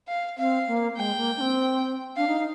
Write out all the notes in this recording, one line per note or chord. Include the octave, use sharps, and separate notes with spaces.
F5
C4 F5
A#3
G#3 G5
A#3
D4
C4
D4 F5
D#4
D#4